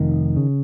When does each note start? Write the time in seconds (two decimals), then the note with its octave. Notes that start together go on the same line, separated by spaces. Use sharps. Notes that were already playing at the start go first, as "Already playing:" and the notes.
Already playing: F1 D#3
0.37 C#3